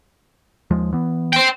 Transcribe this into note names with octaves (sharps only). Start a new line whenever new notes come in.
D#2 F3 G#3
E3 B3
C5 G5